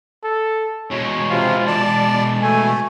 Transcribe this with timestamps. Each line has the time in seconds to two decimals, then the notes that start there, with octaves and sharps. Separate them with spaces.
0.24 A4
0.91 B2 G#3 C#5
1.30 C3 F4
1.67 D5 A5
2.42 A3 G#5